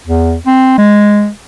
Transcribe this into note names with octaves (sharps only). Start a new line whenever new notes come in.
E2
C4
G#3